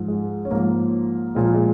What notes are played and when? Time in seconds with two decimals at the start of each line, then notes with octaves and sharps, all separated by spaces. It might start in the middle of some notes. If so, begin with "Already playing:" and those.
Already playing: G#2 F3
0.08 G#3
0.45 C#4
0.51 G#2 F3 A#3
1.35 A#2 F3 G#3
1.54 G#3